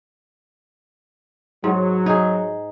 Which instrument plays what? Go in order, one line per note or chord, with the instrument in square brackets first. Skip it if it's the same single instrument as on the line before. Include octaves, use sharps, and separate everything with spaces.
[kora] G#2 [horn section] F#3
[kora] D#4 G#4